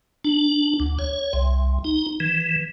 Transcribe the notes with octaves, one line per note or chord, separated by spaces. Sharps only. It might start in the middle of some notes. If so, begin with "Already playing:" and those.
D4
D2
C#5
C2
D#4
E3